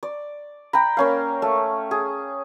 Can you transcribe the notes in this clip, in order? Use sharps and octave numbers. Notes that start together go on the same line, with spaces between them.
D5
G5 A#5 B5
A#3 C#4 F5
A3
G#4